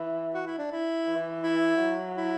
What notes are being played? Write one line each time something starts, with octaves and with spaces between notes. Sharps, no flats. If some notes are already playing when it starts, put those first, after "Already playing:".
Already playing: E3
F#4
E4
D4
E4
E3
E4
F#3
E4